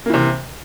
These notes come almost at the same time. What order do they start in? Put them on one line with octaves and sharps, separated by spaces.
A#3 E3 C3